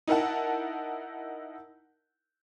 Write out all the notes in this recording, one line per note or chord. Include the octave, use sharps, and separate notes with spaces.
D#4 E4 A#4 F#5 A5